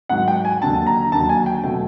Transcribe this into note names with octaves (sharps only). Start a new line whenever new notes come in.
G#2 D#3 F#3 F#5
G5
G#5
D#2 D3 F#3 A5
A#5
D#2 D3 F#3 A5
G#5
G5
B2 F#3 A3 G5